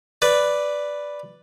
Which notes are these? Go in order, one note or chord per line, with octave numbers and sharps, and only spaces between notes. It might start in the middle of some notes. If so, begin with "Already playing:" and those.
B4 D5